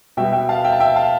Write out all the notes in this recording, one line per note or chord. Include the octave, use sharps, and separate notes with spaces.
B2 G3 B3 E5 G5
E5 G5
F5 A5
E5 G5
A5
E5 G5
F5 A5